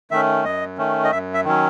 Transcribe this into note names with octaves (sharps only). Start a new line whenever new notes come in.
D#3 A3 C#4 E5
F#2 D#5
D#3 A3 C#4
D#5
F#2 E5
E5
D#3 F#3 C#4